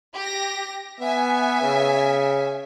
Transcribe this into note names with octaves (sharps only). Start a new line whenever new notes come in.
G4 A#6
B3 E5 G#5
C#3